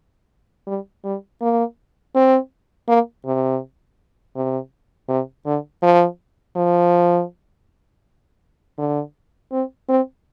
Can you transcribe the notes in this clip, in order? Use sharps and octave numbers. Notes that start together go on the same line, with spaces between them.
G3
G3
A#3
C4
A#3
C3
C3
C3
D3
F3
F3
D3
C4
C4